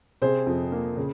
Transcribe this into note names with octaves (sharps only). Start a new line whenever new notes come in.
C3 G#4 C5
F2
A#3
C#3